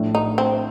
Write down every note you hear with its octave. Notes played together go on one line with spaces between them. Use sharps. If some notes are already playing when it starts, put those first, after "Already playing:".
Already playing: A#1 A2 A3 D4
D#4
C4